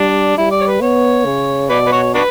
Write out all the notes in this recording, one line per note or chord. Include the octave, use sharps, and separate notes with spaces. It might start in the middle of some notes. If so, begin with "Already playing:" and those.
Already playing: G3 D4
G3 E4
D5
C#5
B4
B3 C#5
C#3
B2 B4 D5
B4
F#4 C#5
D4 F#4 B4